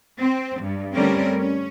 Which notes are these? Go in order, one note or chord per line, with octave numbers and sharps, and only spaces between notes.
C4
G2
D3 G3 A3 C4 C#4 A#4
C#4